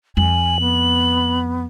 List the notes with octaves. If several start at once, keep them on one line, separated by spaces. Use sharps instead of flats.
F2 G#5 F#7
B3